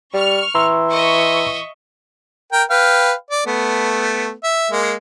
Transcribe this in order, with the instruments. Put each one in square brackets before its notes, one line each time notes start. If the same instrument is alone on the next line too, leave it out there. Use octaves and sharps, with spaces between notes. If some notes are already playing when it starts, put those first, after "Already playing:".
[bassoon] G3 [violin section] C#6 F6
[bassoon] E3 [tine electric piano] A#5 C6 E6
[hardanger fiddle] D#5 E5 [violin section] C#6
[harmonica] A#4 G5
B4 F5 G5
D5
A3 B3
E5
G#3 A#3